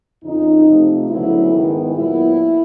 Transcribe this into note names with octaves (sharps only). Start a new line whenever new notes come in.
F2 C#3 F3 D#4
C3 F3 A3
D2 C#3 F#3 B3 E4
G#2 D#3 G#3 B3
A#2 F#3 B3 E4